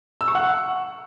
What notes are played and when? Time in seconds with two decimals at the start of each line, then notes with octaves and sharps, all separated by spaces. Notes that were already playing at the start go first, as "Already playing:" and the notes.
0.21 E6
0.28 C#6
0.35 F#5